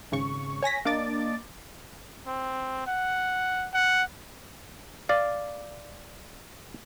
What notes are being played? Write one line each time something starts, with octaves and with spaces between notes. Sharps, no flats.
G#1 C#3 C#6
C#5 G#5 A#6 B6
A#3 D4 D#5 D6 A6
C4
F#5
F#5
D5 F5